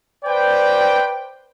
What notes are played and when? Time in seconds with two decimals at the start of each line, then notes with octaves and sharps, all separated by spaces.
0.24 B4 C5 D5 G5